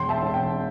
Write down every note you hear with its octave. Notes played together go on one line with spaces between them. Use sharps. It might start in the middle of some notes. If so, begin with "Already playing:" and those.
Already playing: E1 G5 C6
E5 A5
E1
G5